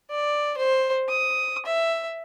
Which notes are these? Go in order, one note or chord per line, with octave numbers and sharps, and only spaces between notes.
D5
C5
D#6
E5